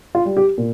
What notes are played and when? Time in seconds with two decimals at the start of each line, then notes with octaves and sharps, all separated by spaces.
0.15 F4
0.25 G3
0.37 G4
0.58 A#2